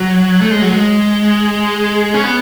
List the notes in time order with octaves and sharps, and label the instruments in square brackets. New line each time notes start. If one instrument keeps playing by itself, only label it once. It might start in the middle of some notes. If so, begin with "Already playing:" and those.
Already playing: [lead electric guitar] F#3
A3
G#3
F#3
G#3
C#4
B3